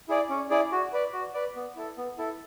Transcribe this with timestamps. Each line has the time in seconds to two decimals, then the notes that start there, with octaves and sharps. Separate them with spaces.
0.09 E4 G#4 D5
0.30 C#4
0.50 E4 G#4 D5
0.72 F#4
0.93 B4 D5
1.13 F#4
1.34 B4 D5
1.55 B3
1.76 E4 A4
1.97 B3
2.18 E4 A4